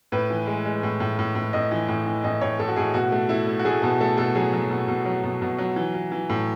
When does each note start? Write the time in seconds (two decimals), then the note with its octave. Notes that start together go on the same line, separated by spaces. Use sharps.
0.12 A2 B4
0.30 E3
0.47 G#3
0.65 G#3
0.83 A2
1.00 A2
1.19 A2
1.35 A2
1.53 A2 D#5
1.71 E3
1.88 A2
2.06 E3
2.24 A2 D#5
2.41 A2 C#5
2.59 A2 A4
2.68 F#4
2.76 A2 G#4
2.94 B2 F#4
3.12 A3
3.29 A3 E4
3.47 A3
3.59 F#4
3.65 A3 G#4
3.82 B2 A4
4.00 A3 A4
4.18 B2 A4
4.35 F#3 G#4
4.53 F#3
4.71 B2
4.88 B2
5.05 F#3
5.23 B2
5.42 B2
5.58 F#3
5.76 E3
5.94 E3
6.12 E3
6.29 A2